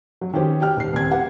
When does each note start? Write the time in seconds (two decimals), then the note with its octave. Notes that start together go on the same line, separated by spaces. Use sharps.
0.21 F#3
0.34 D#3 C#4 G4 C5
0.61 G4 G5 F6
0.76 D#1 C7
0.93 D#1 C4 G#6
1.11 G4 B4 F#5